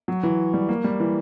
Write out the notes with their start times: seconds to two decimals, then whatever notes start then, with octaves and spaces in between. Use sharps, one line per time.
0.08 F#3
0.23 E3
0.54 G3
0.69 A#3
0.84 G3
1.00 E3